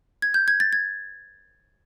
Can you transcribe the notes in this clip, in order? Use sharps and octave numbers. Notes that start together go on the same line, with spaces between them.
G#6
G6
G#6
A6
G#6